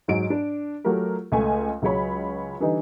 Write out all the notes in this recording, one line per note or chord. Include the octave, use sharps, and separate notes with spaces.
G#2 F#3 D#5 D7
D4
F#3 A3 F4 G4 A#4
C#2 A3 G#5
C#2 F#3 G#3 C#5 B5
D3 E3 G3 D#4